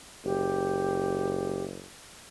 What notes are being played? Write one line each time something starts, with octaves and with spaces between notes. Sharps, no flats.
F#1 G4